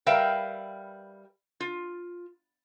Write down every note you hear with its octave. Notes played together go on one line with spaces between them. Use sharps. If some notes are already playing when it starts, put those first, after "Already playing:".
G3 A#4 B4 E5 F5 G5
F4